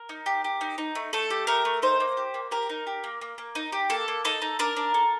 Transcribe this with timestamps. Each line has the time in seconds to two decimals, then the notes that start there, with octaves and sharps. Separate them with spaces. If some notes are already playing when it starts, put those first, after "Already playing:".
Already playing: A#4
0.09 D#4
0.26 G4
0.44 G4
0.61 D#4
0.78 D#4
0.95 A3
1.13 A3 A4
1.30 G4
1.47 A3 A#4
1.65 A3
1.82 D#4 C5
2.00 A#3
2.17 G4
2.34 A#3
2.51 G4 A#4
2.69 D#4
2.87 G4
3.04 A#3
3.21 A#3
3.38 A#3
3.55 D#4
3.72 G4
3.90 A#3 A4
4.08 A#3
4.25 D#4 A4
4.42 D#4
4.59 D4 A#4
4.77 D4
4.94 A4